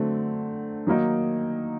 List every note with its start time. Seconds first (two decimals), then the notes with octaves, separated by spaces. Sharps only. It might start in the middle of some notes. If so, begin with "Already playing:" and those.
Already playing: D3 F#3 A3 C4
0.87 D#3 F#3 A#3 D#4